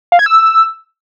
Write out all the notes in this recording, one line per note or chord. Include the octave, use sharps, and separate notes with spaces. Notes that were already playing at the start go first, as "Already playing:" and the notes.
F5
G#6
E6